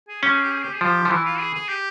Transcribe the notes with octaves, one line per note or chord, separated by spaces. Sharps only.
G#4
C#4 G4
G#4
G4
G#4
G4
G#4
F3 G4
F3
E3 E4
F4
G#4
G#4
G4